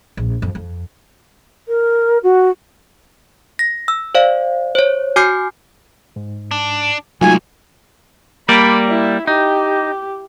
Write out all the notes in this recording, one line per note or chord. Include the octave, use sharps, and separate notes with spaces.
A#1
F2
F2
A#4
F#4
A#6
E6
C5 D5 F5
C5 C#5
F#4 G#5 D6 F6 G6 C7
G#2
D4
C2 F#3 G#3 A3 D#4 F4 F#4 G#5
G3 A#3 D5 B5
E4
D#4 G4